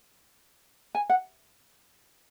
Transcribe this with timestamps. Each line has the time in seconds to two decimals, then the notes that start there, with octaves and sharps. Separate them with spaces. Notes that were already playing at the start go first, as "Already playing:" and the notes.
0.95 G#5
1.10 F#5